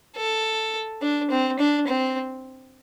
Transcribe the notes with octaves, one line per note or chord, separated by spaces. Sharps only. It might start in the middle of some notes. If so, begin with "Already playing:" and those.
A4
D4
C4
D4
C4